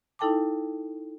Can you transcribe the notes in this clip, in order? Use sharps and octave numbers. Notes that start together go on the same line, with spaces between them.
D#4 E4 A4 G5 A5 D6